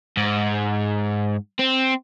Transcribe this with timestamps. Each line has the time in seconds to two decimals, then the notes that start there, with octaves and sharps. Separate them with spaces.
0.17 G#2
1.59 C4